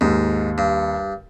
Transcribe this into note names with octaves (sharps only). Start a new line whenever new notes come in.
D#2 G#2
G2